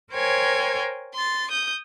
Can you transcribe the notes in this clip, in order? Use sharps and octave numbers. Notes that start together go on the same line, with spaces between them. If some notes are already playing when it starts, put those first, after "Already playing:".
A#4 C5 C#5 G5 G#5
C6 A6
D#6 G6